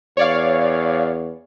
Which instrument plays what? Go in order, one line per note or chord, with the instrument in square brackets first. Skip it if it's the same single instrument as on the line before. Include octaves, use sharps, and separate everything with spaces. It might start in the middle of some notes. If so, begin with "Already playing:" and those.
[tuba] E2 [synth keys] C#5 D5 F5